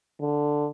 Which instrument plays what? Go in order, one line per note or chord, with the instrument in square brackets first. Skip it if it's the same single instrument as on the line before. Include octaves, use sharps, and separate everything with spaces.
[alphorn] D3